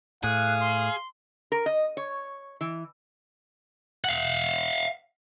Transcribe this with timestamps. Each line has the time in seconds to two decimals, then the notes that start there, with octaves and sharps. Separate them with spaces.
0.24 A2 G#4 F5 F#6
0.61 C6
1.52 A#4
1.66 D#5
1.97 C#5
2.61 E3
4.05 F5 F#5